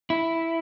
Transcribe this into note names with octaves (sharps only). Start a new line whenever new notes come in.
E4